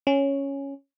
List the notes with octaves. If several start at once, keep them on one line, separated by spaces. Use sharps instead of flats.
C#4